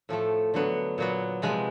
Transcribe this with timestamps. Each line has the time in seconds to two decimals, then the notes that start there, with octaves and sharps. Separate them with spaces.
0.09 A2 F3 A3
0.54 D3 F#3 B3
0.98 A#2 F#3 B3
1.42 C3 F3 G#3 B3